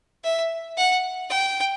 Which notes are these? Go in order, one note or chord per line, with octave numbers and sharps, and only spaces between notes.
E5
F#5
G5